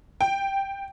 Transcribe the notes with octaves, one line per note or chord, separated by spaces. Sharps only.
G5